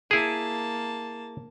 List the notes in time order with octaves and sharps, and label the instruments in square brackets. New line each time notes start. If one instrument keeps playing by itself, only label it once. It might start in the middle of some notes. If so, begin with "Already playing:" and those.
[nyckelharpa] A#3 A5 [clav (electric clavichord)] E4 G#4